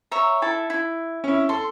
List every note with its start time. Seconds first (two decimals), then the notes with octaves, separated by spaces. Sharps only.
0.11 C#5 E5 A#5
0.42 E4 A4 A5
0.70 E4
1.24 C#4 E4
1.49 A4 C6